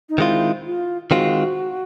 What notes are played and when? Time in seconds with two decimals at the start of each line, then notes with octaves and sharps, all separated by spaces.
0.09 D#4
0.18 D#3 G#3 C4 E4 F4
0.65 F4
1.11 D#3 G#3 C4 F4 F#4